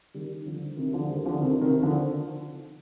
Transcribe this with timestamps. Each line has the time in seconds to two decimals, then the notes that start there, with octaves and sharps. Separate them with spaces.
0.14 D#3 G3
0.46 D3 F3
0.77 C3 D#3
0.93 D3 F3
1.10 D#3 G3
1.25 D3 F3
1.41 C3 D#3
1.61 C3 D#3
1.82 D3 F3